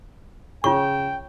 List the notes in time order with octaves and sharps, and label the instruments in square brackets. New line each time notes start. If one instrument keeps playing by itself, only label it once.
[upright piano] C#3 [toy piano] F4 C#5 C#6 [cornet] G5